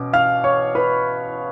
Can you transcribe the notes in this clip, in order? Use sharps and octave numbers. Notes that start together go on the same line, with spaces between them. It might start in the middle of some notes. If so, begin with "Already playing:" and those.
Already playing: B2 C#4 D6
F5 F6
C#5 C#6
B4 B5